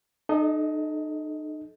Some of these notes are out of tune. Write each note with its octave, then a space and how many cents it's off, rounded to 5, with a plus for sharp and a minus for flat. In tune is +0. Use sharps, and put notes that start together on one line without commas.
D#4 -40 A4 -25 D#5 +20